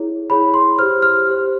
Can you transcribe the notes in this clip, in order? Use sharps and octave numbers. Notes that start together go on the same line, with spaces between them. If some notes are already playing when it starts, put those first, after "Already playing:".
Already playing: E4 G#4 C#5
E4 G#4 C#5 B5
C6
G4 C5 F6
F6
G4 C5